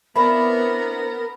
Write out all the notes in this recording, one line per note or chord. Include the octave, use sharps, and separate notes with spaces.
B3 C4 D4 E4 A#4 B5